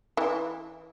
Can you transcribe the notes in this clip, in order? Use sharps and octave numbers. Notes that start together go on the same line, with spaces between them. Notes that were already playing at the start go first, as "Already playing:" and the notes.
E3